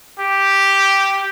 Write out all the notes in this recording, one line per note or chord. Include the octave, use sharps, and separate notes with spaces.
G4